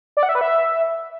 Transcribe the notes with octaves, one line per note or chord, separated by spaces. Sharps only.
D5
F#5
E5
B4
E5